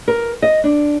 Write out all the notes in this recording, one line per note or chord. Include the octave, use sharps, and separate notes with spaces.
A#4
D#5
D4